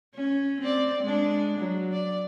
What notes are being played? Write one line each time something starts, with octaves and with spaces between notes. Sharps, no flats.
C#4
C4 D5
G#3 D4
F#3
D5